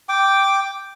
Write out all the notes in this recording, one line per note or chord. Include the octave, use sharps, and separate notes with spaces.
G5 D6